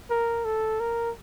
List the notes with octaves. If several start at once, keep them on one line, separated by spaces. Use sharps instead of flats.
A#4
A4
A#4